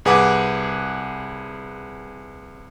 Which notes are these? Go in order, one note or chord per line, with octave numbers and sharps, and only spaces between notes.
C2 G#4 B4 F#5 D6